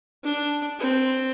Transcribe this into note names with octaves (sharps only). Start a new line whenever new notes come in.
D4
C4